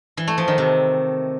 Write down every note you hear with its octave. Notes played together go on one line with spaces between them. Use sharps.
E3
A3
F3
D#3
C3